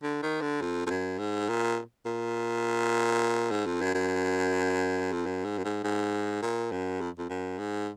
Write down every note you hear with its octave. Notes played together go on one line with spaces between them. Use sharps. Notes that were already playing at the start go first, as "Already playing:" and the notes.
D3
D#3
D3
F2
F2
F#2
G#2
A#2
A#2
G#2
F2
F#2
F#2
F2
F#2
G#2
F#2
G#2
G#2
A#2
F#2
F2
F2
F#2
G#2